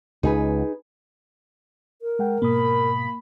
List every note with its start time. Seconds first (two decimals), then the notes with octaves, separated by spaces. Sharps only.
0.23 C#2 D#4 G#4 B4
2.02 A#4
2.19 G#3 F#5 G5
2.42 G#2 B2 A#3 B5 D#6